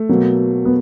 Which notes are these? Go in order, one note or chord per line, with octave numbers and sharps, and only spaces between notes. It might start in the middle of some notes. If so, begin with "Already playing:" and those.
Already playing: A3
B2 F#3 A#3
B3